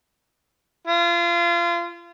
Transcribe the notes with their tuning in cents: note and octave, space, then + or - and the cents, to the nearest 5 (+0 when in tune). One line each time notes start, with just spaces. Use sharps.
F4 -30